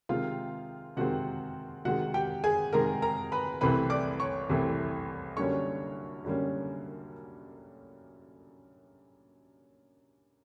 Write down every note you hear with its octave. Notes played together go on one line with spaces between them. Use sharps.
C3 D#3 G#3 C4 F4 F5
C3 D#3 G#3 C4 F#4 F#5
C3 D#3 G#3 F#4 F#5
G4 G5
G#4 G#5
C3 D#3 G#3 A#4 A#5
A#4 A#5
B4 B5
C2 C3 E3 A3 C4 B4 B5
D5 D6
C#5 C#6
C2 C3 E3 A3 C4
F#2 D3 G3 A#3 C#4 C#5 C#6
F#2 D3 G3 A#3 C#4